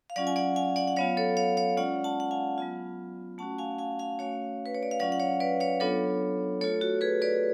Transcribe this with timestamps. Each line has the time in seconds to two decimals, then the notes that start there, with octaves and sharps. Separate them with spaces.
0.10 F5
0.16 F#3 C#4 F4 D5 F#5
0.27 G#5
0.36 D5 F#5
0.56 F5 G#5
0.76 D5 F#5
0.87 F#5
0.96 F#3 B3 F4 C#5 F5
1.17 A4 C#5
1.37 C#5 F5
1.57 C#5 F5
1.77 G#3 C#4 F4 D5 F#5
2.04 F#5 A5
2.20 F#5
2.31 F5 G#5
2.58 F#3 B3 F4
3.38 A3 C#4 F#4 F#5 A5
3.58 F5 G#5
3.79 F5 G#5
3.99 F5 G#5
4.19 A3 C#4 F#4 C#5 F5
4.66 B4
4.74 C#5
4.83 D5
4.91 F5
5.00 F#3 C#4 F4 D5 F#5
5.12 F#5
5.20 C#5 F5
5.40 B4 D5
5.60 C#5 F5
5.80 F#3 B3 D4 F4 A4 C#5
6.61 A3 F4 A4 C#5
6.81 F#4
7.01 G#4 B4
7.22 B4 D5